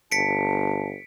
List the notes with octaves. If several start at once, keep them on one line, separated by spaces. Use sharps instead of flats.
G1 A5 B6 C#7 D7